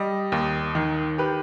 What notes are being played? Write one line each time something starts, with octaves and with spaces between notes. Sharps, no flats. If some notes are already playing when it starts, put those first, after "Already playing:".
Already playing: G3 D#5
D#2
D#3
G4 B4